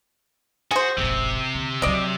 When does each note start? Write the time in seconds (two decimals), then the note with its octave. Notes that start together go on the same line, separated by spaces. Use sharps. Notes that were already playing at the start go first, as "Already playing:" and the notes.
0.71 F#4 G#4 C5
0.98 E1 A1 C3
1.55 D3
1.82 F3 F#3 D5 D#5